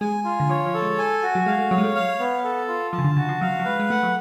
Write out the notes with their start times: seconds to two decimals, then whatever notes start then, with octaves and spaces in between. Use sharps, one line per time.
0.01 G#3 G#5
0.24 F4
0.40 D3
0.49 F3 C#5
0.66 F3
0.74 A4
0.82 G#3
0.98 G#5
1.23 F#4
1.35 F#3
1.46 G#3 F5
1.59 A3
1.71 F#3 C#5
1.78 G#3
1.84 A3
1.95 F5
2.19 B3
2.44 A4
2.68 F4
2.93 F3 A5
2.98 C#3
3.04 D3
3.16 C#3 F#4
3.29 F3
3.41 F#3 F5
3.60 F#3
3.65 G#3 B4
3.80 G#3
3.90 A3 F#5
4.03 F#3